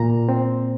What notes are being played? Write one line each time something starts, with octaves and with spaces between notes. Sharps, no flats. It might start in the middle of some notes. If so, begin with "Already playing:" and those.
Already playing: A#2 A#3 A#5
C4